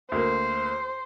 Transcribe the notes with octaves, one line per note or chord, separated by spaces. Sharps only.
D2 A#3 C5